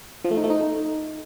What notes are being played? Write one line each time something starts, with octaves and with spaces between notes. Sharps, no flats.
F3
A3
D#4
A3
D#4